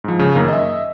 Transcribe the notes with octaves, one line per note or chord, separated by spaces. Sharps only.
G#2 F3
C#3
F#2 D#3 A#3
D#5 E5